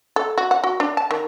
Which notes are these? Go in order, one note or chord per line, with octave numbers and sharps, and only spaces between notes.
A4
F#4
F#5
F#4
D4
A5
D#3